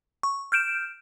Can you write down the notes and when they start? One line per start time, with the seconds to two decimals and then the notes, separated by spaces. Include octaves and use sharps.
0.23 C#6
0.52 F6 G6 D7 E7